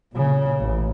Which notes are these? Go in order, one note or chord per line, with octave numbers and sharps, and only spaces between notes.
A#2 C#3
A1